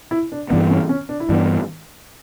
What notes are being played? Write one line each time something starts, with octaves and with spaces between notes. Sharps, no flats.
E4
D4
G2 E3 B3 D4
C#4
C#4
D4
E4
G2 E3 B3 D4